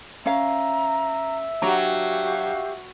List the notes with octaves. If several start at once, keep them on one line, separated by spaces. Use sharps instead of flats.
C#4 E5 F5 A#5
F#3 D4 F#4 G4 F5 A#5